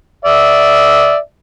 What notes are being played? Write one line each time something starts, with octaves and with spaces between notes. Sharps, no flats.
D5 E5